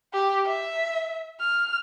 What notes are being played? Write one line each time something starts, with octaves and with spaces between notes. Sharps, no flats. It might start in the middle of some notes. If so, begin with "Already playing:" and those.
G4
E5
F6